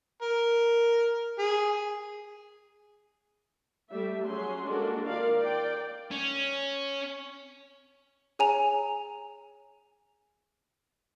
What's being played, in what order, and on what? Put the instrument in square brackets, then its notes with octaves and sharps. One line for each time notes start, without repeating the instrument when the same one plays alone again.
[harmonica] A#4
G#4
[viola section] G3 A3 E5
F#3 C#4 G#4 C6
G#3 A#3 D4 F4 F#4 A4
D#3 F4 A#4 D5 F5
D5 G5
[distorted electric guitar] C#4
[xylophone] G#4 C#5 G#5 A#5 F7